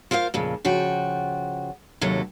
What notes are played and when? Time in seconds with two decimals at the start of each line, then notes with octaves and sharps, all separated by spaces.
0.11 F4 A#4 C5 D5 F5
0.34 F2 A#2 C#3
0.65 C#3 F3 F#4 G5
2.01 D#2 C3 F#3 A4